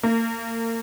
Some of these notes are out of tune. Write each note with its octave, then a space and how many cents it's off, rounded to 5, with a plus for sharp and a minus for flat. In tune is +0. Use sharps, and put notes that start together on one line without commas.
A#3 -35